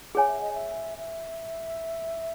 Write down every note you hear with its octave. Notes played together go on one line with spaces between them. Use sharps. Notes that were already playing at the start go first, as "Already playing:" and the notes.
G#4 C#5 F#5 G#5
E5
D#5
E5
E5